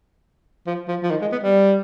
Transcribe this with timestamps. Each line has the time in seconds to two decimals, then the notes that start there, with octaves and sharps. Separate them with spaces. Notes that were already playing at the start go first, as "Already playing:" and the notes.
0.67 F3
0.88 F3
1.03 F3
1.11 D#3
1.21 G#3
1.32 B3
1.43 G3